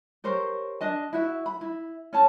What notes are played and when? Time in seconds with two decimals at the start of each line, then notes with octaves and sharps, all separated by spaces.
0.24 G4 A#4 C5 C#5
0.81 D4 D#5 A5
1.13 E4 F#4 E5
1.46 B5
1.61 E4
2.13 C#4 C#5 A5 A#5